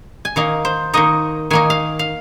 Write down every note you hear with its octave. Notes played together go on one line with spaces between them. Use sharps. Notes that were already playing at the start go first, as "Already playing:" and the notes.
G#5
D#3 A#3 D#4 F5
C5
D#3 A#3 D#4 D#5
D#3 A#3 D#4 G#5
F5
F5